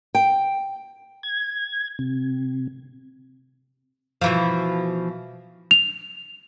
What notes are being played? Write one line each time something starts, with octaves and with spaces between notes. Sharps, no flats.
G5
G#6
C3
B2 E3 F3
F7